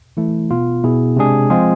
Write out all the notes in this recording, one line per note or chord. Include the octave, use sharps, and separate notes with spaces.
E3 A3 E4
B2 B3 F4
B2 B3 E4 G#4
C3 G#3 D4 G#4
F3 G#3 C4 F4 G#4